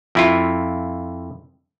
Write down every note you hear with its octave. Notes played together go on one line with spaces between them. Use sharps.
F2 E4 F4